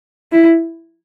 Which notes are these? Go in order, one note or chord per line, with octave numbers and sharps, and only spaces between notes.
E4